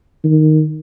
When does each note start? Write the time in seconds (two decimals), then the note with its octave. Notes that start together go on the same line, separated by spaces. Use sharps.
0.24 D#3